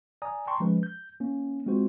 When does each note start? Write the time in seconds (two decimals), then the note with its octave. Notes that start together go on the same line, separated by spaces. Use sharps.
0.22 D5 G#5 A#5 D#6
0.47 G5 A5 A#5 C6 C#6
0.60 F3 G#3 C#4 B4
0.83 G6
1.20 A#3 C#4
1.66 G#3 C4 F4 F#4 C5